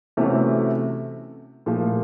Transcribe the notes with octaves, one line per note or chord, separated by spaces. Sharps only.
C3 E3 A3 C#4 F#4
A#2 F3 A3